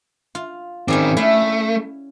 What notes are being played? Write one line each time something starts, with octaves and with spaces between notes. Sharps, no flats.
F4
D#3 C4 C#4 G#4 D5
A3 E4 F5